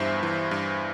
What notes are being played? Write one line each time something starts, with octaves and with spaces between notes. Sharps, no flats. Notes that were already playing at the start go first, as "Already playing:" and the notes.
Already playing: E2 G2 E3 C5 E5
E3
G2